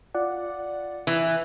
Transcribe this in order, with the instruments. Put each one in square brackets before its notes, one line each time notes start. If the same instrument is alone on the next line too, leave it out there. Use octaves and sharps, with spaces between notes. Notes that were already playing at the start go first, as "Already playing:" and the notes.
[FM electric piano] F4 D5 F#5
[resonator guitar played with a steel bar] E3